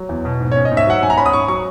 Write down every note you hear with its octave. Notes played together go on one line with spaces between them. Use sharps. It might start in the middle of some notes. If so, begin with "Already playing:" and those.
Already playing: F#3
E2
B2
G#2
C#4 C#5
D#5
G#2
E5
F#3 F#5
G#2 G#5
A#5
C#4 B5
D#6
G#2 C#6
F#3 C#6